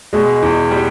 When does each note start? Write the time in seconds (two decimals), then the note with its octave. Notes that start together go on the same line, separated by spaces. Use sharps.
0.13 B2 G#3
0.42 E2
0.71 G3